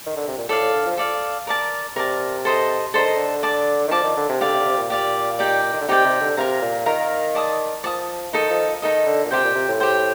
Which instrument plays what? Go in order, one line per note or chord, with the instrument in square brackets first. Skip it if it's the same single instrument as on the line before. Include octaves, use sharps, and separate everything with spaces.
[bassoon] D#3
D3
C3
A#2
[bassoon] A2 [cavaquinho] A4 D5 F5
[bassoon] A2
D3
F3
[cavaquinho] A4 D5 F5
A#4 D5 A5
[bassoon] C3 [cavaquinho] A#4 D5 A5
[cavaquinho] A4 C5 D#5 A#5
[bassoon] D3 [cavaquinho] A4 C5 D#5 A#5
[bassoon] D#3
D3
[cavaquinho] D5 A5 D6
[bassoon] D#3
[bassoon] F3 [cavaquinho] D5 A5 D6
[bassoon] D#3
D3
C3
[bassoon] D3 [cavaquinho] G4 D5 F5
[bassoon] C3
D3
C3
A#2
[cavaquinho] G4 D5 F5
D#4 G4 D5 G5
[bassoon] D#3
D3
[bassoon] C3 [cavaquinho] D#4 G4 D5 G5
[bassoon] C3
D3
[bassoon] C3 [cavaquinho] A#4 F5 A#5
[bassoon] A#2
[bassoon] D#3 [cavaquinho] A#4 F5 A#5
[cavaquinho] D5 A5 D#6
[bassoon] F3 [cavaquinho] D5 A5 D#6
[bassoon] D#3 [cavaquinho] D#4 A4 D#5
[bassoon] F3
[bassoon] D#3 [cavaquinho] D#4 A4 D#5
[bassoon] D3
A#2
[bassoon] C3 [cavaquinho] G4 C5 G5
[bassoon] A#2
C3
A2
[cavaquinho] G4 C5 G5